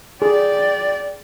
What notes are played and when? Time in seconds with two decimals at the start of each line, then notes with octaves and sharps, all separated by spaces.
0.22 G#4 D5 G5